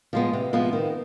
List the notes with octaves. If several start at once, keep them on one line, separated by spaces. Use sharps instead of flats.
F3 G#3 B3
C3
F3 G#3 B3
D#3